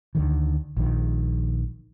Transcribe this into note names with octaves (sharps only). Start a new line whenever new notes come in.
D2 D3 D#3
A#1 D#3